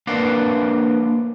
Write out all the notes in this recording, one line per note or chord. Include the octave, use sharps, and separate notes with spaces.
A#3 D4 B4 D5 F5 F#5